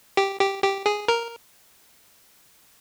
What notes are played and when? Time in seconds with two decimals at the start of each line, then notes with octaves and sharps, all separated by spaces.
0.17 G4
0.40 G4
0.63 G4
0.86 G#4
1.08 A#4